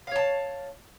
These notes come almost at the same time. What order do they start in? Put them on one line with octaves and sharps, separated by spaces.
F5 C#5 A5